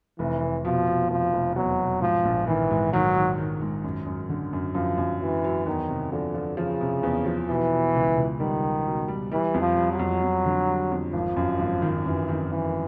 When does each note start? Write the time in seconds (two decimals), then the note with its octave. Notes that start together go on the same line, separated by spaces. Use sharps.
0.19 F1 E3
0.42 F1
0.65 B2 F3
0.87 B2
1.10 F1 F3
1.33 F1
1.56 E2 F#3
1.79 B2
2.01 G#2 F3
2.25 A#1
2.47 D#3 E3
2.71 G#2
2.93 D#3 F#3
3.15 D#3
3.38 D#3
3.62 G#2
3.84 F#2
4.06 F#2
4.29 D3
4.53 F#2
4.75 F#2 F3
4.98 F#2
5.21 E3 F#3
5.44 F#3
5.66 E2 D#3
5.89 C3
6.12 D3 F3
6.34 F3
6.57 C#3 F3
6.81 C3
7.03 E2
7.26 F3
7.49 B2 E3
7.71 B2
7.95 C#2
8.18 C#2
8.40 D#3 G3
8.62 C#2
8.86 B2
9.08 G3
9.32 E3 G3
9.54 F2
9.61 F3
9.77 G3
9.92 F#3
9.99 F2
10.23 F2
10.46 D3
10.68 G3
10.92 F2
11.13 G#1 F3
11.37 F#2
11.59 G#1
11.82 D#3
12.05 F#2 E3
12.29 D#3
12.51 F#2 E3